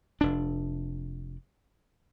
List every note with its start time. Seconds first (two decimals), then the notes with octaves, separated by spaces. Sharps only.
0.21 F1 D4